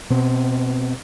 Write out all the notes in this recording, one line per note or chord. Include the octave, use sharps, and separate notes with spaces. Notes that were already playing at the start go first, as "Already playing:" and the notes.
B2 C4